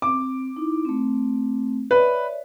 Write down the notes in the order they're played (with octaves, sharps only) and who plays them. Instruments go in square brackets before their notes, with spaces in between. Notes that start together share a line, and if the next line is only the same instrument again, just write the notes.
[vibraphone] C4 [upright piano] D6
[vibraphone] D#4 E4
A3 C4
[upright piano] B4 [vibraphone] C#5 D5 E5